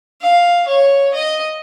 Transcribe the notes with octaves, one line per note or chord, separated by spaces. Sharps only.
F5
C#5
D#5